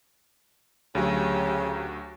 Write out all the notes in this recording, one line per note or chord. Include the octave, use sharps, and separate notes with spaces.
D2 C#3 F#3 G4